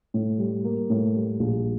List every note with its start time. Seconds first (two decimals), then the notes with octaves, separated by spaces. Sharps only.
0.14 A2
0.38 G3
0.64 A#3
0.90 A2
1.15 G3
1.39 A#1